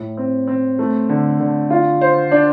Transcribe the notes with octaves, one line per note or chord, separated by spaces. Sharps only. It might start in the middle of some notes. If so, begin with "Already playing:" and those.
Already playing: A2
C4
C4
A3
D3
D3
F4
C5
D4